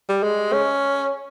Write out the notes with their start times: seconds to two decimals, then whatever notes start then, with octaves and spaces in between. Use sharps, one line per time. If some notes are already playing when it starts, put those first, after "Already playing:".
0.09 G3
0.23 G#3
0.53 C#4